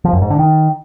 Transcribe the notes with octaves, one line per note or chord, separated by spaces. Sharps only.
F3
F#2
G#2
D3
D#3